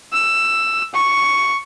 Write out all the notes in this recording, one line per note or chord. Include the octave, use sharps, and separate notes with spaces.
E6
C#6